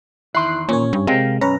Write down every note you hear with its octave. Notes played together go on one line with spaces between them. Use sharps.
E2 D#3 E4 C6 F#6 C7
A#2 C#4 C#5
G2
C3 G#3 A#4 F5 G5
B1 F#2 C#4 B4 A#5